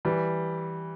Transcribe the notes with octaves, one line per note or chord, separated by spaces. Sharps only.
E3 G3